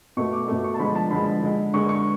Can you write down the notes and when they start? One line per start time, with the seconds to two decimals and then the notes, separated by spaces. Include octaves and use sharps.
0.17 B2 A3 C#6
0.33 D6
0.48 B2 A3
0.64 C#6
0.74 A5
0.79 D3 F3 G#3 B5
0.95 A5
1.11 D3 F3 G#3 B5
1.42 D3 G#3
1.73 D3 G#3 C#6
1.89 C#6